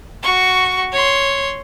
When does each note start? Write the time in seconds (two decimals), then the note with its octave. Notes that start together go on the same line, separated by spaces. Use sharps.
0.23 F#4 C#6
0.92 C#5 C6